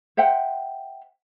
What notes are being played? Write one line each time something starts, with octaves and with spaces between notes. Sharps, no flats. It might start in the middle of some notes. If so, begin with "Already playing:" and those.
C5 E5 F#5 G5